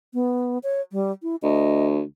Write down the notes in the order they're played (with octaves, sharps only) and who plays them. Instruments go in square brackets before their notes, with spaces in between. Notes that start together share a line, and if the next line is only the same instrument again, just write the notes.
[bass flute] B3
C#5
G3
E4
[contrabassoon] D2 [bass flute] D#5